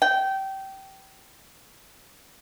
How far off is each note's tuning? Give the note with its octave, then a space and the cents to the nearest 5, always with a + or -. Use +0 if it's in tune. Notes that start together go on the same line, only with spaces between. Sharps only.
G5 -20